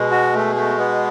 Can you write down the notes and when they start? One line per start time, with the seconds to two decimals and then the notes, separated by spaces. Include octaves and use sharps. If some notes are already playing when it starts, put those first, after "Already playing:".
Already playing: B2 G#3
0.11 F#4
0.34 A3
0.56 A3
0.79 B3